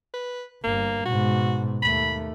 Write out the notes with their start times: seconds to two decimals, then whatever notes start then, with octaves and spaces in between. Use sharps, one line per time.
0.14 B4
0.64 G1 A#3
1.05 G#2 B2 F#4
1.82 D#2 A3 B5